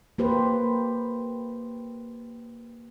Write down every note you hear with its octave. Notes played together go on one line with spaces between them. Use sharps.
A#3 G4 B4 C5